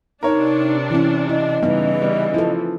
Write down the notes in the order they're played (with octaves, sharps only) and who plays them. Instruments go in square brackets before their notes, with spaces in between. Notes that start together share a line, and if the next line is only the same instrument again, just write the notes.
[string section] C3 D4 [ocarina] D#4 [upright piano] A#4 C#5
[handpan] E3 C#4 [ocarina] E4
[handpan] E4 [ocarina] D#5
[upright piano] G2 [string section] C#3 E3 [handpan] B3 D#4
[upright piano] G3
[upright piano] F3 [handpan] E4 A4